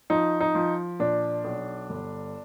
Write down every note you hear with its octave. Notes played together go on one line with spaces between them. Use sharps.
F3 D#4
D#4
F3
A#2 D4
B1
G1